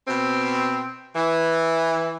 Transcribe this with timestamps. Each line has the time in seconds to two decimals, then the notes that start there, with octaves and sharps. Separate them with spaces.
0.08 B2 C4
1.16 E3